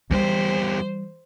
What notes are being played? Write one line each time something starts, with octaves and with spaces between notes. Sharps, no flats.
E2 E3 G3 G4 C5